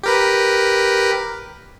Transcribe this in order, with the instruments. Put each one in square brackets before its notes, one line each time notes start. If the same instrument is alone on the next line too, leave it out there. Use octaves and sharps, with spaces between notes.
[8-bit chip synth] G4 A#4 B4